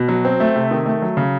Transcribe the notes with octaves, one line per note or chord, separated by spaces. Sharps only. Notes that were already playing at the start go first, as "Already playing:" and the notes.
Already playing: B2
F#3
C4
A3
C3
D#3
A3
F#3
C#3